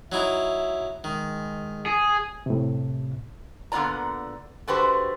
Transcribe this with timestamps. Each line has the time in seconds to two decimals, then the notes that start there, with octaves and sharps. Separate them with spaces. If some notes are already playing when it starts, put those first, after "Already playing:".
0.12 F#3 D#4 E4 E5
1.04 D#3 G#3
1.86 G#4
2.46 A2 C3
3.72 A#2 D3 B3 F4 D5 A#5
4.67 D3 A3 F#4 G4 B4 C5